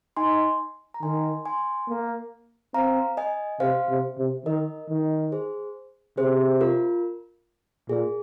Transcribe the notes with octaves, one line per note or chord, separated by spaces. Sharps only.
D#4 G#5 C6
A#5
D#3 G#5 C6
G#5 C6
A#3
C4 F5 A#5
D#5 G#5
C3 C5 F5
C3
C3
D#3 A#4 D#5
D#3
G#4 C5
C3 G#4 C5
F4 A#4
A#2 G#4